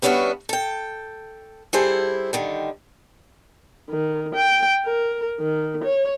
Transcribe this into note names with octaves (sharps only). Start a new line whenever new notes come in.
G3 B3 C#4 D4 F#4 E5
A4 G5
G3 E4 G#4 A4 C5
D3 D#3 G3
D#3
G5
A#4
D#3
C#5